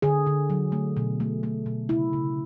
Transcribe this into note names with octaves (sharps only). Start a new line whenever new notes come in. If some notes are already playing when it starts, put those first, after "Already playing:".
D3 G#4
D3
F#3
A3
B2
A3
A3
B2
C#3 E4
C#3